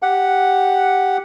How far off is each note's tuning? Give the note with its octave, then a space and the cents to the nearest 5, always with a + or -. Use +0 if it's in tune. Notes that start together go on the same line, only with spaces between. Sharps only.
G4 +0 F#5 +0